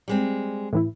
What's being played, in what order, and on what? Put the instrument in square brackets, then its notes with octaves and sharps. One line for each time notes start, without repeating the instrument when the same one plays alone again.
[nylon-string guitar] G3 G#3 C4
[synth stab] A2 E3 E4